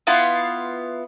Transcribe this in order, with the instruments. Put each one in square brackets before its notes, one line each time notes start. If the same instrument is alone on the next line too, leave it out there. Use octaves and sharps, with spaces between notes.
[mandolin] B3 E4 F4 C6